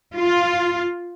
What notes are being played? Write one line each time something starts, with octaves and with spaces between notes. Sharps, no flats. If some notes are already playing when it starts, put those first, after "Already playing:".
F4